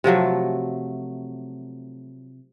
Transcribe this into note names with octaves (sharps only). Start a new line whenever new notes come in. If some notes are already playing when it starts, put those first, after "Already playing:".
C3 F3 F#3 A3